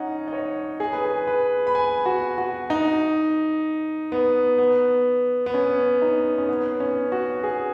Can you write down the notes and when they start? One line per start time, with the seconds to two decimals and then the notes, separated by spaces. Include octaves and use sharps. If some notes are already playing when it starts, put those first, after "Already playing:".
Already playing: C#4 D#4 F#5
0.28 D#5
0.33 C#5
0.80 G#4
0.93 B4
1.05 G#4
1.27 B4
1.67 B5
1.75 G#5
2.06 F#4
2.38 F#4
2.70 D#4
4.12 B3
4.58 B3
5.46 B3
5.54 C#4
6.02 D#4
6.38 C#4
6.49 B3
6.80 C#4
7.12 F#4
7.43 G#4